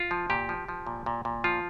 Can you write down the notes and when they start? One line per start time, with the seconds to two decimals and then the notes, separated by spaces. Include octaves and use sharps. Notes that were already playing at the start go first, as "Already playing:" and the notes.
Already playing: F4
0.11 F3
0.30 A#2 G4
0.49 F3
0.69 F3
0.86 A#2
1.06 A#2
1.25 A#2
1.44 F3 F4